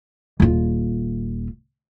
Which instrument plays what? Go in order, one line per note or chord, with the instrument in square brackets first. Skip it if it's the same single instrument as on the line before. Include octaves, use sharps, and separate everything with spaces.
[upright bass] D#1 F4